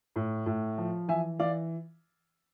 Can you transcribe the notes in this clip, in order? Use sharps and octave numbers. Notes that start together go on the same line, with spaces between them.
A2
A2
F3
E3 E5 G#5
E3 D5 F5